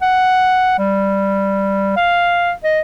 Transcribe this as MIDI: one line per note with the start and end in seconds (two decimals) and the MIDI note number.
0.02 0.76 78
0.78 1.95 55
1.96 2.53 77
2.64 2.80 75